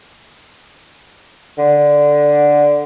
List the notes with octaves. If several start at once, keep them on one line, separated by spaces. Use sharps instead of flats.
D3